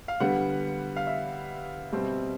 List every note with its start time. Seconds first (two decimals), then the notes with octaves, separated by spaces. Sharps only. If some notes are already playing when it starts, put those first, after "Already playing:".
0.08 F5
0.20 D3 G3 B3 F#5
0.96 F5
1.07 E5
1.92 B2 G3 C4